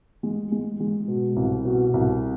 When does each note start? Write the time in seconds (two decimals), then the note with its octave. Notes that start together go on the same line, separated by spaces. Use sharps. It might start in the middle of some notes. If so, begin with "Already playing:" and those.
0.23 G#3
0.52 G#3
0.80 G#3
1.08 B2
1.36 C2
1.65 B2
1.94 C2